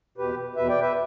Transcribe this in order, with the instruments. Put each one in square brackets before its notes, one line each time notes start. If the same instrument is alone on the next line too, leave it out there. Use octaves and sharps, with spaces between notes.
[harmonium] E2 B2 G4 B4
E2 B2 B4 E5
D5 G5
B4 E5